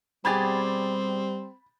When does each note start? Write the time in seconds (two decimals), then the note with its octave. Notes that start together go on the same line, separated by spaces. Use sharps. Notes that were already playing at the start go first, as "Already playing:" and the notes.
0.25 B2 G3 C4 G4 G#4 B5 G#6 A6